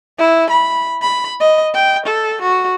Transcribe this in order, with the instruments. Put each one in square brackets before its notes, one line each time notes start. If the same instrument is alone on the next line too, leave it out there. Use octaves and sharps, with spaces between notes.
[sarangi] E4
B5
B5
D#5
G5
A4
F#4